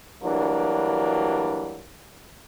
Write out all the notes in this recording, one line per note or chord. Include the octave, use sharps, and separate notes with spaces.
D2 E3 F#3 G3 A#3 D4